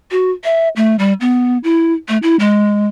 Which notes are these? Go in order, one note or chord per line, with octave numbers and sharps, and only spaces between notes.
F#4
E5
A3
G3
B3
E4
A3
E4
G#3